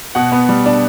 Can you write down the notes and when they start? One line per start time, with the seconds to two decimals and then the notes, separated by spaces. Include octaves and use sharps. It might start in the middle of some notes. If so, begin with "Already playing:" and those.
0.15 B2 F#5
0.32 B3
0.49 G3
0.66 D4